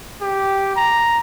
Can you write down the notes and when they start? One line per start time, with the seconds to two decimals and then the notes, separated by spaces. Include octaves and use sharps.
0.22 G4
0.76 A#5